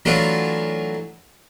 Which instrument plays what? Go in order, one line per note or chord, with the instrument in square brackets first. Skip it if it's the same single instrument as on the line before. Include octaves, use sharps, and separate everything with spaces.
[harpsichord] E3 F#3 A3 D4 F4